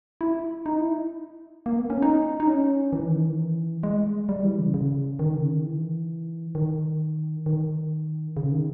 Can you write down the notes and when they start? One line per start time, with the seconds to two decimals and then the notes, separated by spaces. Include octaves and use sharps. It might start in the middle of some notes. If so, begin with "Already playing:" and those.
0.21 E4
0.66 D#4
0.81 E4
1.66 A#3
1.78 B3
1.90 C#4
2.02 D#4
2.40 D#4
2.47 C#4
2.93 E3
3.08 D#3
3.23 E3
3.83 G#3
4.29 G3
4.44 E3
4.59 C#3
4.74 C#3
5.19 D#3
5.35 C#3
5.49 D#3
5.65 E3
6.55 D#3
7.46 D#3
8.37 C#3
8.52 D#3